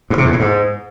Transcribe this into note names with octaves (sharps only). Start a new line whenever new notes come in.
G2
C3
E2
A2
G#2